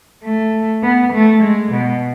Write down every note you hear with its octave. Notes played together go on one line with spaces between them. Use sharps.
A3
B3
A3
G#3
B2